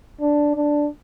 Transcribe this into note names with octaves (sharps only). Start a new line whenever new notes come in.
D4
D4